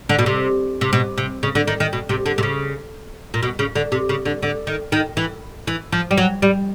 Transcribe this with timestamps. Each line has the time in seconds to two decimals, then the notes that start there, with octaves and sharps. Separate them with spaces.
0.09 D3
0.19 B2
0.26 C3
0.81 C3
0.93 B2
1.18 C3
1.43 C#3
1.55 D3
1.67 D#3
1.80 D#3
1.93 B2
2.09 C3
2.26 D3
2.38 C3
2.43 C#3
3.34 A#2
3.43 B2
3.59 C#3
3.75 D3
3.92 C3
4.09 C#3
4.25 D3
4.42 D3
4.67 D#3
4.92 D#3
5.17 E3
5.67 E3
5.92 F3
6.11 G3
6.18 F#3
6.42 G3